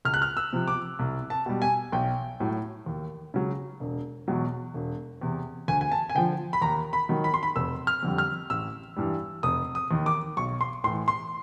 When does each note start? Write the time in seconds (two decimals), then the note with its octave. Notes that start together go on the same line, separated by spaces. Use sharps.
0.05 C#2 F6
0.14 F#6
0.22 F6
0.37 E6
0.53 C3 F3
0.68 D6
0.99 C2
1.30 A5
1.46 B2 G3
1.62 G#5
1.92 B1 G5
2.40 A2 F#3
2.86 D#2
3.34 C#3 F#3
3.80 E1
4.28 E2 B2 F#3
4.74 E1
5.21 E2 C3
5.68 D2 G#5
5.81 G#5
5.92 A5
6.10 G#5
6.15 D3 F3 G5
6.53 B5
6.61 D#2 A#5
6.93 B5
7.09 D#3 F#3
7.24 B5
7.34 C6
7.43 B5
7.56 F1 E6
7.87 F6
8.03 F2 D3 G3
8.18 F6
8.50 A1 E6
8.96 G2 E3 G3
9.43 F1 D#6
9.75 D#6
9.91 D#2 D#3
10.06 D6
10.37 B1 C#6
10.61 C6
10.84 A2 C6
10.87 E3
11.08 C6